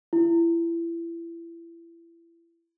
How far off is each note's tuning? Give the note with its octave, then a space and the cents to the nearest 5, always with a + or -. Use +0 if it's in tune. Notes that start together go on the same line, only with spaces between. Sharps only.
E4 +30